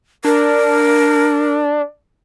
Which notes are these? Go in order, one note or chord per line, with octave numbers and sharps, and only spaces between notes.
D4 A#4